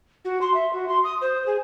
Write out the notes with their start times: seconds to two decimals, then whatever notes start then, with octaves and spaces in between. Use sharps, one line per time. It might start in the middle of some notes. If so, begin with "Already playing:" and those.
0.25 F#4
0.41 C6
0.54 E5
0.73 F#4
0.88 C6
1.04 D#6
1.21 C5
1.46 G#4